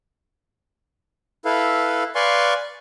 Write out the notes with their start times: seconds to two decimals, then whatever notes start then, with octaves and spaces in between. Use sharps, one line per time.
1.45 E4 A4 B4 F5
2.15 B4 D5 F5 G#5 C6 C#6